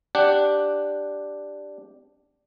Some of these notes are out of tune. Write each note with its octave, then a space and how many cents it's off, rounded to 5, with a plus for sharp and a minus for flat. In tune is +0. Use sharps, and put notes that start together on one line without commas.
D4 +0 G4 +0 F#5 +0